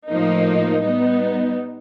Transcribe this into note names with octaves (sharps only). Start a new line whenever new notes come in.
A2 F3 A#3 D#4
G3 B3 D#4